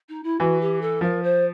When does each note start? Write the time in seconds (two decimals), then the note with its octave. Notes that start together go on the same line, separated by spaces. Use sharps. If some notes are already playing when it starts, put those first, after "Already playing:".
0.09 D#4
0.23 E4
0.39 E3 F#4
0.60 G4
0.81 A4
1.01 F3 A#4
1.23 C5